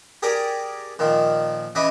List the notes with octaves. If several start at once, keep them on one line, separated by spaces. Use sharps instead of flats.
G4 G#4 A#4 D5
A#2 D#3 F3
C#3 E3 D#5 E5 D6